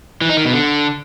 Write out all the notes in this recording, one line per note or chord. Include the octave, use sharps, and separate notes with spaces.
E3
D#4
D#3
B2
D3